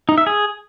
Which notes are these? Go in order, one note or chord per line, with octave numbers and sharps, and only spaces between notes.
D#4
E5
G#4